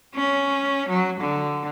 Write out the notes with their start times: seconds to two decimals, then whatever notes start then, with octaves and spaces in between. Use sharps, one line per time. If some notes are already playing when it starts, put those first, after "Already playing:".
0.15 C#4
0.89 F#3
1.21 D3